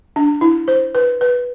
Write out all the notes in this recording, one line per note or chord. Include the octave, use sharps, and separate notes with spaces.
D4
E4
C5
B4
B4